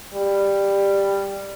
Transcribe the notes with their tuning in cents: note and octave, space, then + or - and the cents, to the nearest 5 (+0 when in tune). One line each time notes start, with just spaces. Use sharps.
G3 +10